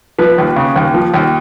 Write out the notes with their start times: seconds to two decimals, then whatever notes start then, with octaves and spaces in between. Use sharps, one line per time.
0.19 F3 B4
0.38 D#2
0.56 C#3
0.76 D#2
0.94 F3
1.14 D#2